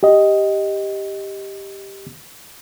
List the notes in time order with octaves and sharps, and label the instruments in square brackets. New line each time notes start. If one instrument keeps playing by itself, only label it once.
[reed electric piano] G4 D#5